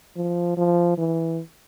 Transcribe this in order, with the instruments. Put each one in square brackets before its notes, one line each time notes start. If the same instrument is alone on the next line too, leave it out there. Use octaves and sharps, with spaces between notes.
[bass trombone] F3
F3
E3